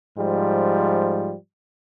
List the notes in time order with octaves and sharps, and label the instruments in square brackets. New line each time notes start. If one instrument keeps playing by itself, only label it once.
[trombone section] G#2 F3 G3